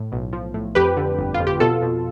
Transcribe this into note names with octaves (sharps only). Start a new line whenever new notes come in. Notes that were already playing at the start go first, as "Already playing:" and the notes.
Already playing: A2
B1
F3
A2
F2 G4 B4
D3
G1
F4
F2
G4
B2 F4 A4
B2